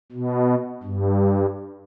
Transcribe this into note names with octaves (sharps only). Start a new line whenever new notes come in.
B2
G2